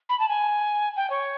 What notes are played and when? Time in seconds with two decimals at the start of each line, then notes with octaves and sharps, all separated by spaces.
0.09 B5
0.19 A5
0.29 G#5
0.96 G5
1.10 C#5